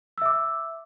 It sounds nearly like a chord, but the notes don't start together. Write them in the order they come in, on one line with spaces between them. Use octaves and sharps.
E6 E5 D6